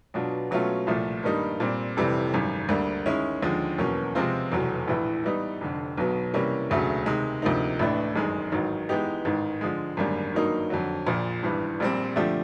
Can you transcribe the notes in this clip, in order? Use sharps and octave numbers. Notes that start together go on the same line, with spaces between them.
B2 F#3 B3 D4 F4
B2 F#3 A3 C#4 F4
C2 A#2 F3 A3
G2 D#3 G3 A#3 D#4
A#2 G3 C4
F1 F2 C3 E3 G3
G#1 F#2 D#3 G3
D2 D3 G3 A#3
D#3 G#3 C#4 E4
D#2 D3 F3 G#3
E2 B2 F#3 A#3 C#4
C3 F3 G#3 C4 F4
F1 E2 B2 F#3
A#1 A2 E3
E3 G3 B3 D#4
F1 F2 D3
B1 B2 F#3 B3
C3 E3 G3 A#3 C#4
E1 D2 C#3 F#3 A3
C3 D#3 G#3
D2 C3 F3 A#3 D#4
A1 A2 E3 A3 D4
G1 F#2 D#3 G#3
A1 G#2 D#3 F#3
E3 G#3 B3 D#4 G4
A1 G#2 D#3
D3 F3 G#3
G#1 F#2 D3 G3 A#3
G2 D#3 F#3 A#3 D#4
F2 D3 F#3
A#1 A#2 F3
G#1 G2 E3 G3
A#1 A#2 G3 C4
D3 F3 A3 D4 G4